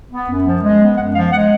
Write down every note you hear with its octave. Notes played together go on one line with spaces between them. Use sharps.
B3
F#2
F3
G#3
B3
F#2 F#5
F3 F5
G#3 F#5